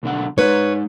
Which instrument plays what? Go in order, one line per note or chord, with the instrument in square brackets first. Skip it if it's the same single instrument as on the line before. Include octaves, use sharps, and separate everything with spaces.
[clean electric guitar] B1 D3 F#5
[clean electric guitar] G#3 D#4 [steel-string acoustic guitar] B4 C#5